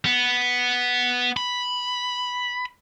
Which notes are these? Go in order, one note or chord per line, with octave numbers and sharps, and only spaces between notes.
B3
B5